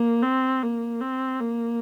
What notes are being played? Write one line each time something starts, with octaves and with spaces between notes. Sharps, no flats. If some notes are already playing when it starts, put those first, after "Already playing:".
Already playing: A#3
C4
A#3
C4
A#3